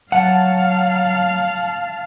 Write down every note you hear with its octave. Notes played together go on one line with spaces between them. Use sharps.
F#3 F5 F#5 A5